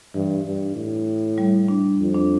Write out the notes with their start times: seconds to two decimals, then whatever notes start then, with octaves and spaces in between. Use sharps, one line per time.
0.14 G2 E3
0.45 G2
0.76 A2
1.38 G3
1.68 D4
1.99 F2
2.15 D4